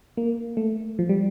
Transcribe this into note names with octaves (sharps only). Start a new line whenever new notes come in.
A#3
A3
F3
G3